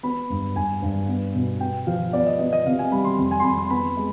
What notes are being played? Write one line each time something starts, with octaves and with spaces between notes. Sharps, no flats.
B3 B5
G2
G2 G#5
G2
B3
B2
B3 G5
F3 F5
B3 D5
D#5
B3 D#5
D#5
C3 F5
G#5
G3 B5
C6
F2
G#5
C6
F2 B5
C6
B3 B5
G#3